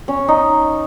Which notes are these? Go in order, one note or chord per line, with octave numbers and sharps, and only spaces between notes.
C#4
D#4